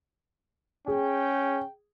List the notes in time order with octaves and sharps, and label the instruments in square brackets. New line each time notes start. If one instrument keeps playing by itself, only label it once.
[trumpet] C#4 [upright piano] G#4 [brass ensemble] G5